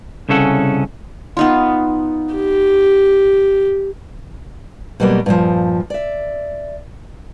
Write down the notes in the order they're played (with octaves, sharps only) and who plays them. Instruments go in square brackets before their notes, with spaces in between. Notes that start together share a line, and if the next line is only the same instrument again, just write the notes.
[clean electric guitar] C2 C#3 C#4 A4 F#5
[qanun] B3 D#4 F4
[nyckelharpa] G4
[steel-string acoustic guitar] B2 F#3 G3 A#3 B3
G2 A#2 E3 F3
D5 E5